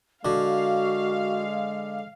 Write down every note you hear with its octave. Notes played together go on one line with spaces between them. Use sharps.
D3 G#3 F#4 F5